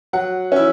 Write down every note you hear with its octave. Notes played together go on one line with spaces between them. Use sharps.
F#3 F#5
C#4 E4